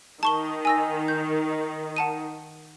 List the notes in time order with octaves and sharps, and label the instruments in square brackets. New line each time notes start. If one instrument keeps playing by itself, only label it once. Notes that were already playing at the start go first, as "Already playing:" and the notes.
[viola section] D#3 [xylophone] A5 C#6 G7
[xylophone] G#5 E6 A#6
G6
F#5 A5 D#7